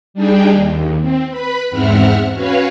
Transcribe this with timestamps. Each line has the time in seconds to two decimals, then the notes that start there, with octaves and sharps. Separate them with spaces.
0.14 G3 D4 D#4 G#4 G5
0.50 D#2
1.01 C4
1.30 B4 B5
1.70 E2 G#2 C4 E5 F#5 F6
2.32 C#4 F#4 B4 C#5 F5